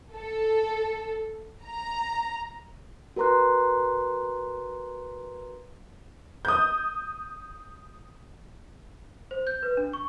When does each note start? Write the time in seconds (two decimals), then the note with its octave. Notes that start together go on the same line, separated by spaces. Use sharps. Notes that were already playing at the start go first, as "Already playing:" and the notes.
0.15 A4
1.65 A#5
3.16 F#4 A#4 B4 A#5 C6 F#6
6.45 D#6 G6
9.31 C5
9.47 G6
9.63 B4
9.77 D4
9.93 C#6